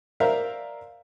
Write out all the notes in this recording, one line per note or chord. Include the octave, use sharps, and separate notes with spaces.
A#4 C5 D5 E5 F5